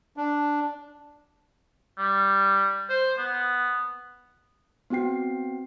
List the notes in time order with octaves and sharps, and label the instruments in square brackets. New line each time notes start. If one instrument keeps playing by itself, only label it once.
[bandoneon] D4
[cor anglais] G3
C5
B3
[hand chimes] B3 C4 F#4 G5 C7